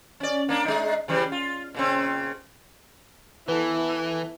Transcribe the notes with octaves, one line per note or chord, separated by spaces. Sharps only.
C#4 D5
A#3 D4
G#3 D#4
C#3 E3 G3
F4
A#2 C#3 C4
E3 B3 E4 A4